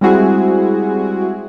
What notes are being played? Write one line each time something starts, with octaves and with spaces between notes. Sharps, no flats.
G3 G#3 C4 E4 F#4 G#4